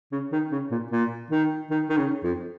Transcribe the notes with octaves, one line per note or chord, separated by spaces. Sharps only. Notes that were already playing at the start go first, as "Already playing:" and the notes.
C#3
D#3
C#3
A#2
A#2
D#3
D#3
D#3
C#3
F2